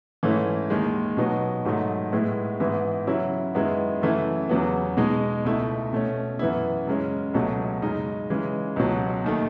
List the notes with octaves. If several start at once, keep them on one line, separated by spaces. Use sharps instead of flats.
G#2 E3 A3 C#4 E4
D#2 D#3 G#3
B2 F#3 B3 D#4
G#2 D#3 F#3 A3
A2 G#3 B3 E4
G#2 E3 B3 E4
C#3 F#3 C#4 E4
F#2 D#3 G#3 B3 E4
F#2 C#3 E3 A3 E4
E2 C#3 F#3 B3
B2 G#3 D#4
C#2 B2 A3 E4
B2 A3 C#4
F#2 E3 B3 E4
F#2 C#3 G#3 C#4
C#2 B2 F#3 A3
F#2 C#3 G#3 D#4
C#3 E3 G#3
C#2 B2 F#3
D#2 D#3 A3